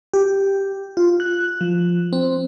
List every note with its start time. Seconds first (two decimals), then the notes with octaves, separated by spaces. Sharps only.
0.14 G4
0.97 F4
1.20 F#6
1.61 F3
2.13 C4